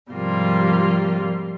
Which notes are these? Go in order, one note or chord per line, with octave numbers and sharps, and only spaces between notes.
G#2 C3 F3 G3 A#3 F4